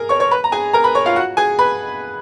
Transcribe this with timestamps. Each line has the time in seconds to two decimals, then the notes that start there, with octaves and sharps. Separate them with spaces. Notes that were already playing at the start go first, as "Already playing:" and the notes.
Already playing: G#4 A#4 A#5
0.09 C#5 C#6
0.20 C#5 C#6
0.31 B4 B5
0.44 A#5
0.52 G#4 G#5
0.73 A#4 A#5
0.84 B4 B5
0.95 C#5 C#6
1.06 F4 F5
1.16 F#4 F#5
1.37 G#4 G#5
1.59 B4 B5